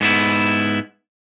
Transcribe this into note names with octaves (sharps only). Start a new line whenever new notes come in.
G#2 B3 E4